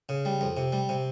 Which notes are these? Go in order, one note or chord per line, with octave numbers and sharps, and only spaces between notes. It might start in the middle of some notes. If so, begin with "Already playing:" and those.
C#3
G3
F2
C3
G3
C3